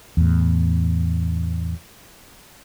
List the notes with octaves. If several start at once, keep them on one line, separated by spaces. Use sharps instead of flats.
E2 A2